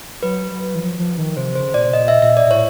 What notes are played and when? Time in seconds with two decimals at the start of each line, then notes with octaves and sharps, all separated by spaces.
0.23 F#3 B4
0.51 F#3
0.75 E3
0.80 F3
0.99 F3
1.18 D#3
1.37 C3 C5
1.55 C#3 C5
1.74 A#2 D5
1.88 B2
1.93 A#2 D#5
2.08 E5
2.22 A#2 E5
2.37 D5
2.46 A#2
2.50 A2 C#5